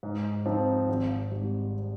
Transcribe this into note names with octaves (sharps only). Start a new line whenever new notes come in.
G#2
F3 C4 D#4
G#1
G#2 G3